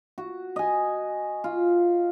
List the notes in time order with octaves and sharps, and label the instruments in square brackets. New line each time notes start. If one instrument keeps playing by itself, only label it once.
[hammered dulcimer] F#4
D#5 G#5
F4